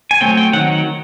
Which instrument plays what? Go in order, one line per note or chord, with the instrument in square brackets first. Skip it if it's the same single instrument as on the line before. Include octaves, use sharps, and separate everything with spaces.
[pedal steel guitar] G#5
F#3 A3 C4 G5
G5
D#3 F#3 F#5